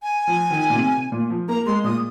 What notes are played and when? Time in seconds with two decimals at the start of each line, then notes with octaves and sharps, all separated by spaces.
0.02 G#5
0.27 F3
0.50 D#3
0.70 A#2
0.76 C3
1.12 A#2
1.30 F3
1.49 A#3 A#5
1.66 G#3 C6
1.84 A#2 D#6